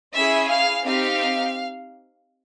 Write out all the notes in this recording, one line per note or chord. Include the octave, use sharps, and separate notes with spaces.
C#4 E4 G#4 E5
F5
C4 D#4 G4 F5